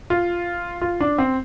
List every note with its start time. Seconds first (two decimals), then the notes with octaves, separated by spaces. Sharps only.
0.10 F4
0.81 F4
1.00 D4
1.18 C4